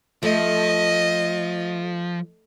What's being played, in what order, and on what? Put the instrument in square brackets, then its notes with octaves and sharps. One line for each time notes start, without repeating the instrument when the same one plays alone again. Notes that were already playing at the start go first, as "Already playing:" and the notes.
[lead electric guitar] F3 [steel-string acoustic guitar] A3 [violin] D#5